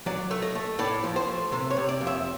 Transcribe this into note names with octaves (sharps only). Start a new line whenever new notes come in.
F#3 D5
A3
D#5
A3
A2 D5
F3
C5
A3
C3 C5
C#5
C3
D5
F2
E5